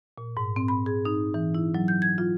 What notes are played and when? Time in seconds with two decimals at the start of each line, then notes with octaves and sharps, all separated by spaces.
0.18 A#2
0.37 G#2
0.56 C4
0.68 B5
0.86 G#4
1.05 D#4
1.34 E3
1.55 E4
1.75 F#3
1.88 G6
2.02 G#6
2.18 F4